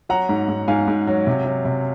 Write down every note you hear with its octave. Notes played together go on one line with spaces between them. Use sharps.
F#3 F#5 A#5
G#2
G#2
G#2 F5 G#5
G#2
F#3
C3
F#3
C3